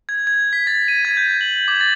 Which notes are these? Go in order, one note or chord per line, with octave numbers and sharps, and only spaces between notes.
G#6
G#6
B6
A6
D#7
G#6
G6
F#7
D6
A6